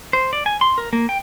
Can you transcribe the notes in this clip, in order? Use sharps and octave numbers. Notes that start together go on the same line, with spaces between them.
C5
D5
G#5
C6
A#4
A#3
G5